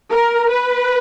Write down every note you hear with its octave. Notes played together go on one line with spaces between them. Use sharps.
A#4
B4